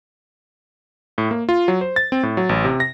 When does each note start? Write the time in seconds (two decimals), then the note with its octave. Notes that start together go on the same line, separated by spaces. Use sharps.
1.18 A2
1.31 A#3
1.49 F4
1.68 F#3
1.81 C5
1.96 A6
2.12 C4
2.23 A2
2.37 F#3
2.49 A1
2.65 C3
2.80 A#6